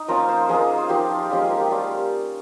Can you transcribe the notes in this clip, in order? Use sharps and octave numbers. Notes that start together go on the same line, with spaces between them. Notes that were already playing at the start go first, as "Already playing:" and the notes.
Already playing: D#4
F3 A#3 C#4 F4 A#5
C5
F3 A#3 D#4 G#4
F4
F3 A#3 D#4 G4
F4
F3 G#3 C#4 F4 G4
G#4
A#4
G4
G3 C#4 F4 G4